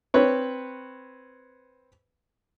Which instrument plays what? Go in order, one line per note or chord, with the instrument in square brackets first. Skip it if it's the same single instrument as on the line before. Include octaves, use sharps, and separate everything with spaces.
[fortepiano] C4 B4 C#5